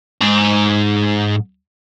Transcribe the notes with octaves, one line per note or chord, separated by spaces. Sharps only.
G#2 A#5